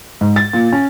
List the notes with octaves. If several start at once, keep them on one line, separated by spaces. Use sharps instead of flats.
G#2
A6
A#2
C#4